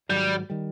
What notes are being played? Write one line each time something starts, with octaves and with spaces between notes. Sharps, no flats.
G#2 D#3 F#3 G3
D#3 G3